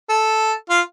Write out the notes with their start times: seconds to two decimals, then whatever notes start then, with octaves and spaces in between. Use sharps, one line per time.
0.10 A4
0.70 F4